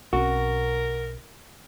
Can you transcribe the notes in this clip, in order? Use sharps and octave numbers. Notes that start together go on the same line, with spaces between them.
B1 C4 C#4 F#4 A#4